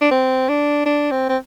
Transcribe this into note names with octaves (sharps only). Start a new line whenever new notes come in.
D4
C4
D4
D4
C4
C4